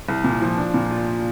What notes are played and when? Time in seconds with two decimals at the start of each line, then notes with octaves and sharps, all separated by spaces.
0.09 C2
0.24 A#2
0.42 F3
0.57 D4
0.74 A#2
0.91 F4